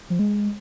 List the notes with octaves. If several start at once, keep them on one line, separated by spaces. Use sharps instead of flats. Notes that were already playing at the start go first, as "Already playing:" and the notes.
F3
G#3